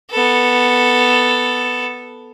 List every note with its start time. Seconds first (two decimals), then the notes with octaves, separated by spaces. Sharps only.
0.11 B3 A4